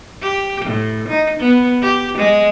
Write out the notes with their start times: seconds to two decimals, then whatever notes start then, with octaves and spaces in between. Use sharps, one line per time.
0.22 G4
0.65 A2
1.09 D#4
1.40 B3
1.82 G4
2.18 G#3